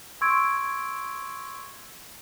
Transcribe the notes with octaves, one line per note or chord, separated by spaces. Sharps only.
C6 C#6 E6 G#6 D7